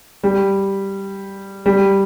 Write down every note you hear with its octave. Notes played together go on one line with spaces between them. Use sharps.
G3
G3